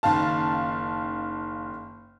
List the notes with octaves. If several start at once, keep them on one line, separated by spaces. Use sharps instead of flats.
F#1 D#3 F5 A5